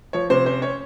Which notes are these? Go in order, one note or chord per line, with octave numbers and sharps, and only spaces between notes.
F3 C#5
C3 C5
C#4 C5
C#4 C#5